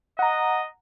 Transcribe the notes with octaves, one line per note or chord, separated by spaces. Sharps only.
D#5 F#5 A#5